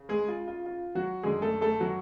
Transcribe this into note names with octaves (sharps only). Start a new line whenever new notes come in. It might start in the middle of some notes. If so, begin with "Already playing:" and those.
Already playing: C#3
G#3 G#4
F4
F4
F4
F#3 F#4
F#2 D3 G#3 G#4
A3 A4
A3 A4
F#3 F#4